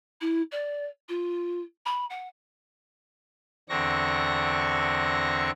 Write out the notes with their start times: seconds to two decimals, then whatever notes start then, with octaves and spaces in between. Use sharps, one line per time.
0.21 E4
0.51 D5
1.08 F4
1.85 B5
2.10 F#5
3.69 E2 D3 C4 D4 C#6 A#6